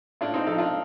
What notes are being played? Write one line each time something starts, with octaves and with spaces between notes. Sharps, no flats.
A2 D4 F4
C4 D#4
F3 F4 A4
D4 F4